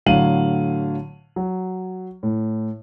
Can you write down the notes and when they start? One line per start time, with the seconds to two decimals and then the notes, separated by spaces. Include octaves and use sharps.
0.06 A2 D3 F#3 F5 D#7 F#7
1.36 F#3
2.23 A2